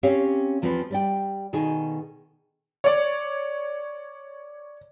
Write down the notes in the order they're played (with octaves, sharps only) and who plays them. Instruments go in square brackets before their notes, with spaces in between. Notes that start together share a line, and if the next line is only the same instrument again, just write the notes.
[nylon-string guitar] C4 C#4 G4 C#5 F5
E2 F3 C4 F4 B4
G3 D5 G5
B2 D#3 D#4 G#4 A4 G#5
[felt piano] C#5 D5